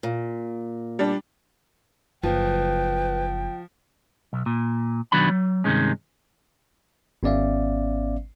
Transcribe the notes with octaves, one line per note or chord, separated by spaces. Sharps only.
A#2
G3 D4
F#1 F3 B4 G5
B1
A#2
B1 D#3 F#3 B3 D4 B5
F#3
G2 C3 D#3 G#3 C#4
G#1 B3 C#4 D5 E5 F5